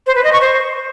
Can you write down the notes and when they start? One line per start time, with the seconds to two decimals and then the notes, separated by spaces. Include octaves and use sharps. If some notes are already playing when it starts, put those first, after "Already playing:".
0.06 C5
0.15 B4
0.23 D#5
0.32 C#6
0.41 C5